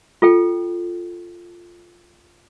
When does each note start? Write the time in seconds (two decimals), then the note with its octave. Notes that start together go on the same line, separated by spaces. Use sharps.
0.22 F4 A4 G5